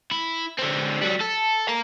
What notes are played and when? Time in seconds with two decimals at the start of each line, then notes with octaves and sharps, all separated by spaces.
0.11 E4
0.59 D3 C4
1.01 F#3 G3
1.20 A4
1.68 F5 A#5